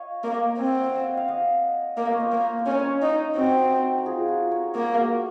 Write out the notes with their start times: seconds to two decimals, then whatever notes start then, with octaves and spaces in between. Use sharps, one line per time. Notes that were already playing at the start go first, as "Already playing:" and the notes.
Already playing: C#5 D#5 F5
0.24 A#3
0.58 C4 G#5
0.71 F#5
0.83 F5
0.95 D#5 F#5
1.17 F5
1.28 D#5 F#5
1.97 A#3 F5
2.05 D#5
2.13 C#5
2.20 C5 D#5
2.32 A#3
2.59 C5
2.66 C#4 A#4 C#5
3.02 D#4
3.36 C4 D#4 F#4
3.99 A#4
4.05 F4 G#4
4.28 F#4 A#4
4.51 A#4 C#5
4.75 A#3 A#4
4.85 G#4
4.95 F#4 A#4